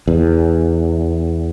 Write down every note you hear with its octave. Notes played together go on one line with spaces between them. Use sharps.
E2